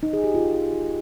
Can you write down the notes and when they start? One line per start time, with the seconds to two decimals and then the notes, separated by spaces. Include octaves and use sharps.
0.03 D#4
0.13 G#4
0.24 G4
0.34 F4